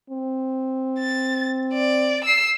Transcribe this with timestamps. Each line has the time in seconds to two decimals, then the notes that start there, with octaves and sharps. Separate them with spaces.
0.10 C4
0.99 A6
1.73 D5
2.25 E6 C7